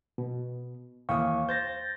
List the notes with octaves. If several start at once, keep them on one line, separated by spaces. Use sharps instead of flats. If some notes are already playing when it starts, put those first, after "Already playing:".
B2
D#2 E3 F5 G5 C#6 D#6
C5 G6 A6 A#6